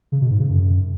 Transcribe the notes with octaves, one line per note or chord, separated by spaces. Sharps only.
C#3
B2
G#2
C#3
F#2